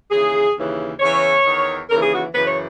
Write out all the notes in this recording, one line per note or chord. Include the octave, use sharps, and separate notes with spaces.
D#2 C#3 E3 G#4
D#2 C#3 E3
E2 C#3 E3 C#5
E2 D#3
D#2 C#3 E3 A#4
G#4
F#4
F#2 C#3 E3 B4
C#5